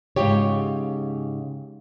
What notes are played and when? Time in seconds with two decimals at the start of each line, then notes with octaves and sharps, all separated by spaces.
0.16 G#2 C#3 F4 G4 C#5